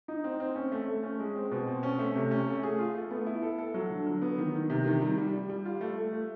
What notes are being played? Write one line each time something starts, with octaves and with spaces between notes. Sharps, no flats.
D#4
C4
C4
C#4
A3
A3
C#4
G#3
C4
B2
C4
C#4
A3
C3
C#4
A3
G#4
F4
A3
B3
E4
A4
A4
F#3
D3
F#3
B3
D#3
D#3
C3
D#3
G3
G3
G3
G3
F4
A3
A3
A3